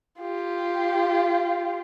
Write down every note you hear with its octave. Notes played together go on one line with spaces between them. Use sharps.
F4 G4